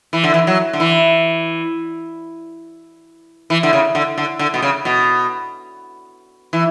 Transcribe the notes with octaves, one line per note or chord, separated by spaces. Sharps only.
E3
D3
E3
F#3
D3
E3
E3
D3
C#3
D3
D3
D3
B2
C#3
B2
E3